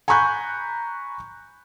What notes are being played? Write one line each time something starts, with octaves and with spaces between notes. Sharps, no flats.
G#5 A#5 B5 C#6 F#6 G6